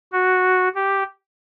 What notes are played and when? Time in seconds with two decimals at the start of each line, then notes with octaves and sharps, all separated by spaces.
0.12 F#4
0.75 G4